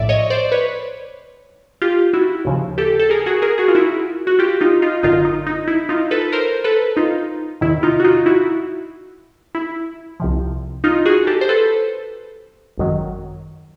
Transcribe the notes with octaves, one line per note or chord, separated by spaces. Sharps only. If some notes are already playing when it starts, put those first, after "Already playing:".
Already playing: A#1 A2 F3 D5 E5
C#5 D#5
C5 D5
B4 C#5
F4 G4
E4 F#4
D#2 C#3 F3
G4 A4
A4
G#4 A#4
F#4 G#4
G#4 A#4
F#4 G#4
F4
E4 F#4
F#4
F4 G4
D#4 F4
D#4 F4
G#1 F#2 D3 D#4 F4
D#4
D#4
E4
D#4 F4
A4 B4
A#4 C5
A4 B4
D#4 F4
E2 C3 D#3 E4
D#4 F4
F#4
D#4 F4
E4 F#4
E4
C2 C3 F3
D#4 F4
F#4 G#4
G4 A4
C5
A4 B4
G#1 F#2 D#3 F#3